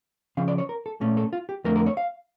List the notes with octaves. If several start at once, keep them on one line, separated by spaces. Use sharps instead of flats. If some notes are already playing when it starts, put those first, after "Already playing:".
C#3 F3 C#4 F5
D5
C#5
A#4
A4
A#2 A3 C#4
A4
F4
G4
F2 D3 A3 A#4
A#4
C#5
F5